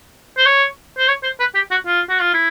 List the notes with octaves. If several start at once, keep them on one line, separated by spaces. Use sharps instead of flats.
C5
C#5
C5
C#5
C5
B4
G4
F#4
F4
F#4
F4
E4